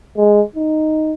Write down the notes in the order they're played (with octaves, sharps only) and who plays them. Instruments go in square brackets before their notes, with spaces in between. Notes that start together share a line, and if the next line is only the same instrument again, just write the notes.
[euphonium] G#3
D#4